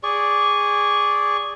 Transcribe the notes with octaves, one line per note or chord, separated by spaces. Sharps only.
G#4 D5 C#6